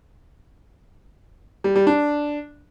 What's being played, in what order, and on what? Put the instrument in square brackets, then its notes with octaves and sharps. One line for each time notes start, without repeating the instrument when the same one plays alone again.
[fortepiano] G3
G3
D4